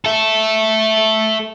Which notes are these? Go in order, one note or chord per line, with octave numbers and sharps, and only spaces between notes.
A4 E5